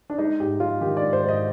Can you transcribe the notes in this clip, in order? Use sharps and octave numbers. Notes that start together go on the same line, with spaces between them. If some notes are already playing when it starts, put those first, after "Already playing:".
D4
G#3 D#4
G#2 G4
G#3 F4
D#3 G4
D5
G#2
C5
G#2 D#5